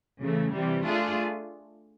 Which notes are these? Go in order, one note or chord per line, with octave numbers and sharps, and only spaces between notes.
C#3 E3 A3
C3 E3 G3
A3 D4 F4 G#4